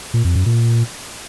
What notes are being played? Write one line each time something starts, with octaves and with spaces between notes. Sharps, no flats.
A#2
F2
F#2
A#2